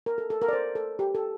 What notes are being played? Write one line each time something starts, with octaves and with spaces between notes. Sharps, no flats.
A#4
A4
A4
A#4
D5
C5
A4
G4
A4